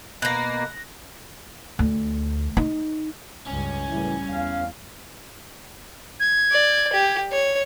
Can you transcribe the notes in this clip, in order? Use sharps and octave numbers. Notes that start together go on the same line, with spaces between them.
B2 A#3 F#6 A#6
D2
D#4
C#2 G2 C#4
F#1 A2 E3 G3
E2 F5
G#6
D5
G4
C#5